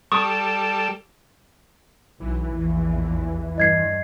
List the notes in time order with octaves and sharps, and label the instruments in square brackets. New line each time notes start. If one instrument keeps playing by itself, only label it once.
[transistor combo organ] G3 A4 [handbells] C#6 D#6
[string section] B1 [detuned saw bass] E3
[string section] A#1 E2
[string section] G2 [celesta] D#5 G#6 C7